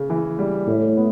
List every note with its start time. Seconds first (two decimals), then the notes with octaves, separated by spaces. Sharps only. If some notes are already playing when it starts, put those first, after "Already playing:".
Already playing: C#3
0.10 E3
0.39 G3
0.68 A2
0.96 B3